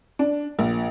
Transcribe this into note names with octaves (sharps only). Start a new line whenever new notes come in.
D4
A#1